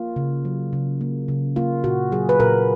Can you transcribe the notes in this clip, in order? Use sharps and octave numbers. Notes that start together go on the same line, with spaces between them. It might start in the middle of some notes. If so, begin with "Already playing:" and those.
Already playing: A#3 F4
C#3
F#3
C#3
A#3
C#3
A#3 F4
A#2 F#4
F#3 G#4
B4
A#2 A#4